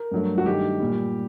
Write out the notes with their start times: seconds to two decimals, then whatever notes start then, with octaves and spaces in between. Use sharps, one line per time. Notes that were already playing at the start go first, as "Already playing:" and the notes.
Already playing: A#4
0.11 G2 F#3 A3
0.38 F#4
0.46 G2 D#3 A3 G4
0.80 A#2 G3